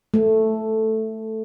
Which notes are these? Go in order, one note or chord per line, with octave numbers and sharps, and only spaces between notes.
A3